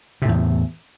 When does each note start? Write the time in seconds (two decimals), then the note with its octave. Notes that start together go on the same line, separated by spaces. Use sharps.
0.22 C3
0.25 A2
0.29 E2